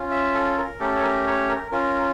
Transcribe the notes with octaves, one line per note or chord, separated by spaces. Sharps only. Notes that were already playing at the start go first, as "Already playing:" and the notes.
Already playing: C#4 F4
E5
A4
A#4
A3 C#4 G4 A4
C#5
A#4
C#5
A#4
C#4 F4 A#4